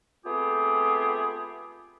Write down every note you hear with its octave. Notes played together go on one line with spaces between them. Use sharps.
A3 B3 C4 F4 G4 G#4